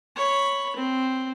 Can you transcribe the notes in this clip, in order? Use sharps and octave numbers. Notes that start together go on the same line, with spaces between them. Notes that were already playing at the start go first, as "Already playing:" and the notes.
C#5 B5
C4